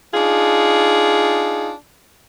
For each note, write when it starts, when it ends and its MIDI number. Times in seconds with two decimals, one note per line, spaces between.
0.14 1.71 62
0.14 1.71 63
0.14 1.71 65
0.14 1.71 68